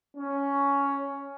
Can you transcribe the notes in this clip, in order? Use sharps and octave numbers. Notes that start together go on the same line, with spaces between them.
C#4